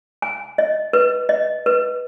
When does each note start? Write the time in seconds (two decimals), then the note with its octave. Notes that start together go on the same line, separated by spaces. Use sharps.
0.22 G#5
0.58 D#5
0.93 B4
1.29 D#5
1.66 B4